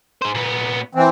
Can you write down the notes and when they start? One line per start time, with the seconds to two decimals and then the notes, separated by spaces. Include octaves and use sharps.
0.22 G#4 C5
0.35 A#2 B3
0.95 E3 C4